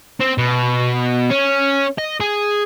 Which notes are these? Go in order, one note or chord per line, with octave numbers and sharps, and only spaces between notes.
C4
B2
C#4
D#5
G#4